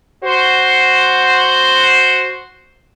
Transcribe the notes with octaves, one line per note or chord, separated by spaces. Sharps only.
F#4 C5